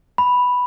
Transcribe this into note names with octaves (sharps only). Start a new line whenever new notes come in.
B5